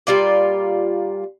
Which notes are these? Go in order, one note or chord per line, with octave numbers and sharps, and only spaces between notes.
A#2 G3 F4 D5